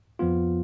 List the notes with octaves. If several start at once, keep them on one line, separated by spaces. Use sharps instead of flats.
F2 F3 B3 F4